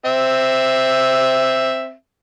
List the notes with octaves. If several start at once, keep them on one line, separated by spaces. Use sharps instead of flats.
C4 E5